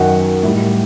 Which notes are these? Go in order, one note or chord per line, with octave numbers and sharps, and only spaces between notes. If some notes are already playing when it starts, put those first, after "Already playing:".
Already playing: F#2 D#3 F#3 F#5
A2 G3